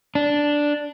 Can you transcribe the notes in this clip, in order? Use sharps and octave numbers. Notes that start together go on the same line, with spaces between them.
D4